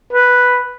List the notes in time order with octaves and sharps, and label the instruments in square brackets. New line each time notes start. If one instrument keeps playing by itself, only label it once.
[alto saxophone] B4